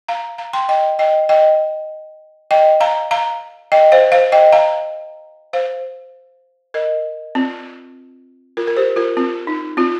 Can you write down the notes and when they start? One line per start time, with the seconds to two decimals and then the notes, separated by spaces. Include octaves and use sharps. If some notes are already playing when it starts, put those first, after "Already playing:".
0.08 F5 A#5
0.38 F5 A#5
0.53 G5 C6
0.69 D#5 G5
0.99 D#5 G5
1.29 D#5 G5
2.51 D#5 G5
2.80 F5 A#5
3.11 F5 A#5
3.72 D#5 G5
3.92 C5 F5
4.12 C5 F5
4.32 D#5 G5
4.53 F5 A#5
5.53 C5 F5
6.74 A#4 D#5
7.35 C4 F4
8.57 F4 A#4
8.67 A#4
8.77 G4 C5
8.96 F4 A#4
9.17 C4 F4
9.47 D#4
9.77 C4 F4